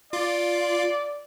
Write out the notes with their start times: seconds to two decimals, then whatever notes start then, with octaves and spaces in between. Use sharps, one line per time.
0.13 F4 D5